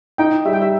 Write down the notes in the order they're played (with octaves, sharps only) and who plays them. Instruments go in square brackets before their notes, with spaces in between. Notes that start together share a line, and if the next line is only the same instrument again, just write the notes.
[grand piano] D#4 [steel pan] G5
[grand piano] G3 [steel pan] E5
[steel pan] G5
E5